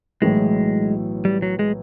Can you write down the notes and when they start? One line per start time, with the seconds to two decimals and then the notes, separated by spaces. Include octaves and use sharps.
0.22 B1 A2 E3 G#3
1.25 G3
1.42 F#3
1.59 G#3